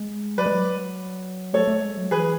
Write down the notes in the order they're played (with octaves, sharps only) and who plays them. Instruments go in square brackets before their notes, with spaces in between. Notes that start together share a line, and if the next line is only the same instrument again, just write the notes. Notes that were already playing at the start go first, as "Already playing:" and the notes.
Already playing: [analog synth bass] G#3
[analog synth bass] F#3 [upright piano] B4 D5
[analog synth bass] G#3
F#3
[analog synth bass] A3 [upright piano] A4 C#5
[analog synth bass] A3
G#3
F#3
[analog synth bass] E3 [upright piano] G#4 B4